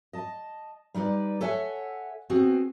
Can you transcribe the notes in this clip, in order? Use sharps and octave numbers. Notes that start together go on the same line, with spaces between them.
D#5 A5
G3 D#4 B4 D5
A4 C#5 E5 F#5 G#5
B3 C4 F#4 G#4